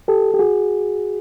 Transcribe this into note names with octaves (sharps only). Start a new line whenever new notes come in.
G4 A4
G4
F#4 G#4